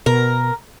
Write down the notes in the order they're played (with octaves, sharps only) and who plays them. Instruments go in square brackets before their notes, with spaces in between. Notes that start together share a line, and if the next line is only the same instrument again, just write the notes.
[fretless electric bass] B2 [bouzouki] A#4